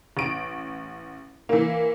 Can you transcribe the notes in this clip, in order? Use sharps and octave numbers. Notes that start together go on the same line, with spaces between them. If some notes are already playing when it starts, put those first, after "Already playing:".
A1 D7
E3 A#3